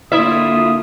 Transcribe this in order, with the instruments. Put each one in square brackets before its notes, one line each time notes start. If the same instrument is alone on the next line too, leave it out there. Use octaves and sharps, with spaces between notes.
[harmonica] D3 D#6 [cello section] A#3 F4 [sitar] E4 E5